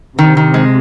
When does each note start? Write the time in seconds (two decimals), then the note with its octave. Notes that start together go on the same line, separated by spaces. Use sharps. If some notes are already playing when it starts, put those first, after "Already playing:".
0.18 C3 D#3
0.37 D#3
0.54 G#3